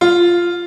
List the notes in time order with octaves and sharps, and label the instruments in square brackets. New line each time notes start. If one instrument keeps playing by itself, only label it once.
[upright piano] F4